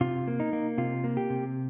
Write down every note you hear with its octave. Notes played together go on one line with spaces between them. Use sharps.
C3 F4
A#3
D#4
A#3
C3 F4
A#3
G4
C3